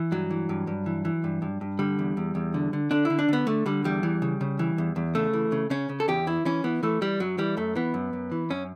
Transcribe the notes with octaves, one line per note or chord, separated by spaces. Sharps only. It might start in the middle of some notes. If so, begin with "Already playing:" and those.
Already playing: E3
G2 F#3
E3
G2
G2
E3
E3
G2
G2
G2
D3 G3
E2
E2
E2
D3
D3
D3 D4
D3 E4
D4
D3 B3
D3 A3
D3 G3
E2 G3
E3
C#3
C#3
E3
E2
E2
C#3 A3
E3
C#3
C#3 C#4
C#3
A4
E2 G4
E3 E4
E3 C#4
E3 B3
E3 A3
E3 G3
F#2 F#3
E3 G3
F#2 A3
E3 B3
F#2
F#2
E3
F#2 C#4